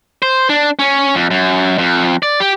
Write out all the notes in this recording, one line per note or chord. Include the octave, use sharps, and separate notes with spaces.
C5
D4
C#4
F2
F#2
F2
D5
G4